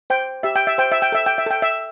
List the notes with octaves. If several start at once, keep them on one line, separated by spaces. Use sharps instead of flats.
C5 G5
G4 E5
G5
E5
C5 G5
E5
G5
A4 E5
G5
E5
A4 G5
E5